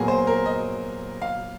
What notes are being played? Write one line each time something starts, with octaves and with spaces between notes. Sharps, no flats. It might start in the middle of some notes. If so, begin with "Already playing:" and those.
Already playing: A#2 F#3 B3 G#4 A#4
C5
A#4
D#5
F5